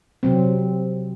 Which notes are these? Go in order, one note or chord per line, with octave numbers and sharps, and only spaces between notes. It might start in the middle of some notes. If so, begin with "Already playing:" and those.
C3 F#3 C4